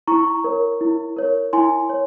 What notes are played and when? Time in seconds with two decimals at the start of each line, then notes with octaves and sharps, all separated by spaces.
0.07 E4 A#5 C#6
0.44 A#4 C#5
0.81 E4
1.17 A#4 C#5
1.53 E4 G#5 C6
1.90 C#5